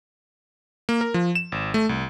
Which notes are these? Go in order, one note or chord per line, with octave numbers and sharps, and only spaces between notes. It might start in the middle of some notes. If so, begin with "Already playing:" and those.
A#3
A#4
F3
E7
G#1
A3
C2